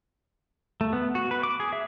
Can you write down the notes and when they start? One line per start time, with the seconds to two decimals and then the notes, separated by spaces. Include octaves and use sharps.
0.81 A3
0.93 B3
1.15 F#4
1.31 B4
1.43 D6
1.60 G#4
1.73 E5